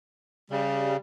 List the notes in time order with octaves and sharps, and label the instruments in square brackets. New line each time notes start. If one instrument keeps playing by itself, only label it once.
[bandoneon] C#3 [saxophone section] G3